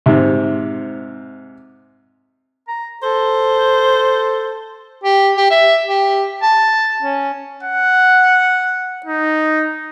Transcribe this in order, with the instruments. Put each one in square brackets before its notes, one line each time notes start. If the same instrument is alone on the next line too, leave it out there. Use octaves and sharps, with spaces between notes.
[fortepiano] G#2 C3
[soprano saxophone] A#5
[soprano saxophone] A4 [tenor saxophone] C5
[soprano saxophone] G4
G4
E5
G4
A5
C#4
[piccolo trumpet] F#5
D#4